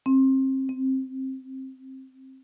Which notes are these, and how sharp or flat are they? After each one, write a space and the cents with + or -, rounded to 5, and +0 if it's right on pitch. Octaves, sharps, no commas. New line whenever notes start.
C4 +30
C4 +10